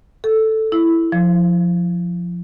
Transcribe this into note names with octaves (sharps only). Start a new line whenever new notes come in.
A4
E4
F3